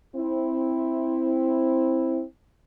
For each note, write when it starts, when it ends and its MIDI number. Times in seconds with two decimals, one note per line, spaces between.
0.16 2.23 60
0.16 2.23 64